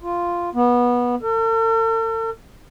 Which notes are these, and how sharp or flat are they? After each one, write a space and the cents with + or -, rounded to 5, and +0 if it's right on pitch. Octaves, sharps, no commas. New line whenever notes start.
F4 -5
B3 -20
A4 +45